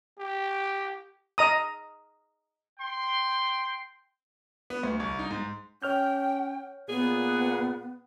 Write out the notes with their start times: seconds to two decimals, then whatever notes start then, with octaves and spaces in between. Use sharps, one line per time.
0.19 G4
1.38 D#5 A#5 D#6
2.79 G5 C6
4.70 B3
4.83 D2
5.00 C2
5.19 D#4
5.31 G#2
5.82 C#4 C#5 G5 F6 G6
6.89 A#2 B3 G#4